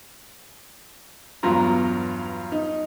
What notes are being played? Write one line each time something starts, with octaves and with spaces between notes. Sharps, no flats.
E2 G2 F#3 F4 A#5
D#4